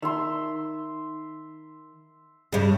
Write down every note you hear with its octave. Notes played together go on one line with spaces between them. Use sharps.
D#3 E5 C6
G2 C#3